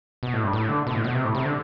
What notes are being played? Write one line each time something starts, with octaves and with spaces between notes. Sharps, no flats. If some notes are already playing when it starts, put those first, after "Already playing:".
B2
A2
G2
A2
D3
B2
A2
B2
C3
A2
C3
D3